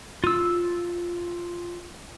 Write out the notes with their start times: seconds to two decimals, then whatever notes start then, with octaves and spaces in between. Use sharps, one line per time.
0.24 F4 E6